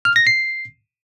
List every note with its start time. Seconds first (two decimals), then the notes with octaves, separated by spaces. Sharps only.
0.05 F6
0.16 A#6
0.27 C7